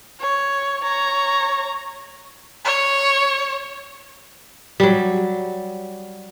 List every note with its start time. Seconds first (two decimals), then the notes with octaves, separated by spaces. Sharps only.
0.21 C#5
0.84 C#5 A#5
2.65 C#5
4.80 F#3 G3